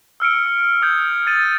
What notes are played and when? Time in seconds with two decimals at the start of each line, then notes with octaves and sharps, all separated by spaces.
0.20 E6 F6 C#7 D7
0.82 D#6 G6 G#6
1.27 G#6 A6 D#7